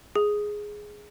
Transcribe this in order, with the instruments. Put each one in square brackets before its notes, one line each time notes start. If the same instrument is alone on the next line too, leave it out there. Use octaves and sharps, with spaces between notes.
[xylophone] G#4